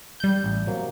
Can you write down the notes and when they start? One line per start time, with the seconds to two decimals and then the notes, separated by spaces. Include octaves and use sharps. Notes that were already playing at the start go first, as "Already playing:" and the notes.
0.20 G3 G6
0.44 A1
0.67 C3 F#3 A#3